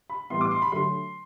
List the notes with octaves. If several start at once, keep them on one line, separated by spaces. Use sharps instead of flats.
B5
A2 E3 G3 B3 C6
D6
C6
B5
D3 F#3 A3 C6